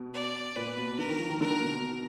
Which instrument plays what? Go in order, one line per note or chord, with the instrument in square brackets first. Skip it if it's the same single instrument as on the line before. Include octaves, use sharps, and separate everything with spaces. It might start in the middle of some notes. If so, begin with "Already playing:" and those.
Already playing: [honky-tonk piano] B2
[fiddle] D5
[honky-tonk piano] A#2 [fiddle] B4
[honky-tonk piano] B2
[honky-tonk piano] D3 [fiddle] A#4
[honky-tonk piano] D#3
F3
D#3
[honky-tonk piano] D3 [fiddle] A#4
[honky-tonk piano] B2